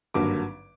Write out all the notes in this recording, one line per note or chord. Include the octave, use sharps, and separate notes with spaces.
G#1 G2 D3 F#3 A#3 D6